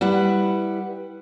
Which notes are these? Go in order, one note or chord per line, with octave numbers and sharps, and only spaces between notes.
G3 E4 B4 F#5